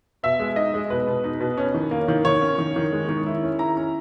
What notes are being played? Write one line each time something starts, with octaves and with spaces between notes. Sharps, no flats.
B2 E5
G#3
D#4 D#5
G#3
B2 B4
B2
D#4
B2
C#4
D#3
A#3
D#3
D#3 C#5
C#4
D#3
D#3
G#3
D#3
E4
C#4
E4 A#5
C#4